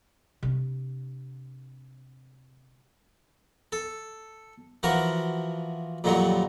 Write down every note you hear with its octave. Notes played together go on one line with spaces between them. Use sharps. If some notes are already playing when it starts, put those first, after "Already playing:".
C3 D4
A4
E3 F3 F#4 A#4
F2 A#2 D#3 F#3 G3